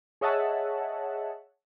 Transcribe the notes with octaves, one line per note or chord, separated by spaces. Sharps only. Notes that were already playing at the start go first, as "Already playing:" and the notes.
G#4 C#5 D#5 E5 F#5 A5